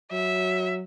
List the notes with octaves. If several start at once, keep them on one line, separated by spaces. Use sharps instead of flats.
F#3 E5